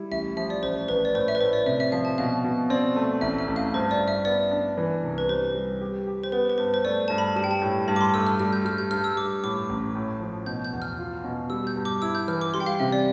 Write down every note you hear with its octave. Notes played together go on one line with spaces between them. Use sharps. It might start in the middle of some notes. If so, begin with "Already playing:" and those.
Already playing: G3 E4
A1 E5
F3 E5
D5
A1 C5
A1 B4
D5
A2 C5
E5
B4
A2 C5
D5
C3 E5
E5
F3 F5
A5
B2 F5
B2
C4 D5
A3
A1 E5
E5
A1
F5
G2 C5
D5
G2
E5
B3 D5
D4
E3
C2
B4
G3 C5
G3
G4
G4
C5
B3 B4
B4
G2 C5
C5
A3 D5
G2 A5
B5
G3 A5
G5
A5
A2
G2 B5
D6
C6
A3 E6
F6
G3 F6
G6
G3 F6
G6
G2 F6
E6
G2 D6
A2 D6
A1
A2
F3
B2 G6
G6
E2
F6
F4
B2
G3 E6
G6
G2
D6
E4 E6
G6
E3 F6
D6
G3 C6
G5
F5
C3 E5
D5